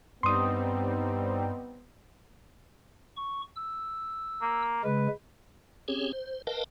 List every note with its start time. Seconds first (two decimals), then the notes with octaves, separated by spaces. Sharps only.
0.23 G2 G3 B3 C4 D#4 C6 D#6
3.17 C#6
3.56 E6
4.42 A#3
4.84 C#3 G#3 B4
5.88 C4 C#4 G4 G#4 C#5
6.13 C5
6.47 A#4 B4 D#5 F5 G5 A5